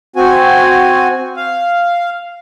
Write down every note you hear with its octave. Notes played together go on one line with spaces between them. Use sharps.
C4 F#4 G#5
F5